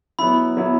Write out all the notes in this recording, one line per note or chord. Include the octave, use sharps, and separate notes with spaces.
F#3 B3 E4 B5
F#3 B3 E4